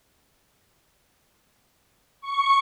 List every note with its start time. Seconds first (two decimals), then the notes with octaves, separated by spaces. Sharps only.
2.21 C#6